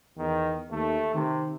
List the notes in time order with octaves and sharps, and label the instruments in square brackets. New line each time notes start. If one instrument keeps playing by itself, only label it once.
[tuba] E2 [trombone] D#3
[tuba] D#2 [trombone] A3
[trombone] C3 [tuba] D#3